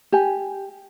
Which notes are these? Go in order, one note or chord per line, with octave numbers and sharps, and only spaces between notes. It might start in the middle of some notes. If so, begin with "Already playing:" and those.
G4 G#5